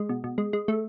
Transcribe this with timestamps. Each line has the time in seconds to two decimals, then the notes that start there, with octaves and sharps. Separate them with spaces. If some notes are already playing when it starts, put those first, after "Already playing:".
Already playing: G#3
0.09 B2
0.24 B2
0.38 G#3
0.53 G#3
0.68 A3